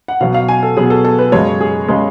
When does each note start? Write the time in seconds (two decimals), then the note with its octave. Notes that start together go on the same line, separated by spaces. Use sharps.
0.08 F#5
0.21 B2 F#3 B3 F5
0.34 F5
0.48 G#5
0.63 A4
0.77 B2 F#3 B3 G#4
0.90 A4
1.05 A4
1.19 B4
1.32 F#2 C#3 G#3 C#5
1.61 G#4
1.88 C#3 G#3